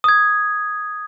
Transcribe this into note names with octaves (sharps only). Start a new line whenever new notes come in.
D#6 G#6